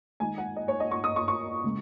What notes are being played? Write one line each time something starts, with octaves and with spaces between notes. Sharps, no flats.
D#3 G#3 D#4 G#5
F#5
D#5
C#5
D#5
C#6
D#6
C#6
C#6
C#3 G#3